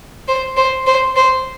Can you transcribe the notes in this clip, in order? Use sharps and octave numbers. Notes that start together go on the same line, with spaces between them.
C5
C5
C5
C5